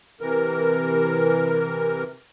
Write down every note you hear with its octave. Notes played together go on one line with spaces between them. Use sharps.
C3 E3 A#4